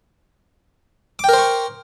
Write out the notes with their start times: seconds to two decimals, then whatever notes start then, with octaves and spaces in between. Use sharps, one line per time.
1.19 D6
1.24 G5
1.29 A#4
1.33 C5
1.38 C#6